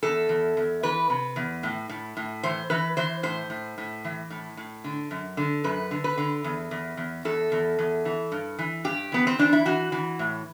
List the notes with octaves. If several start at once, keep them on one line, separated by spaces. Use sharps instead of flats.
E2 A4
E2
E2
E3 B4
C3
E2
A2
A2
A2
E3 C5
E3 B4
E3 C5
A2 C5
A2
A2
E3
A2
A2
D3
F#2
D3
F#2 B4
D3
B4
D3
E2
E2
E2
E2 A4
E2
E2
E3
G2
E3
G2 G4
E3 B3
C4
E3 D4
E4
E3 F#4
E3
A2